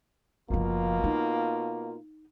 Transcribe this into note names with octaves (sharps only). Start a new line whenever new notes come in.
F#1 B2 F3 A#3 F4
D#4